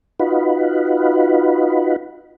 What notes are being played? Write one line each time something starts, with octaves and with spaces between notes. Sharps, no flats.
D#4 F4 F#4 B4